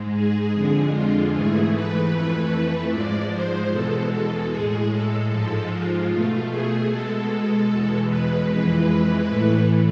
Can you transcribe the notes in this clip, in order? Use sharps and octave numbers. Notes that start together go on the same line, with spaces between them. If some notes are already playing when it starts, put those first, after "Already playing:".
Already playing: G#2 G#3
G#4
F2 D3 G#3
F4
G#2 E3 A3 G#4
B4
F2 E3 A3
G#2 F3 G#3 D5
C5
E2 B2 G#3 A4
A4
A2 G#3 G#4
A4
G#2 F3 G#3 A4
F4
B2 A3 F4
G#4
B2 G#3 A4
E2 B2 G#3
B4
F2 E3 G#3 B4
A2 E3 A3